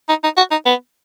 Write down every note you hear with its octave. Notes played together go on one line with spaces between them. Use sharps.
D#4
D#4
F#4
D#4
B3